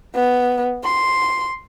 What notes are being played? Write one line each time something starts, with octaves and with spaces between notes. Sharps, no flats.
B3
C6